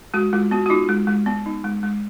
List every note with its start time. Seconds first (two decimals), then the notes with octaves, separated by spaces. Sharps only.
0.14 G#3 F#4
0.33 G#3 F4
0.51 B3 F#4
0.66 F#4
0.70 D#4 F4
0.89 G#3
1.07 G#3
1.26 B3
1.46 D#4
1.64 G#3
1.83 G#3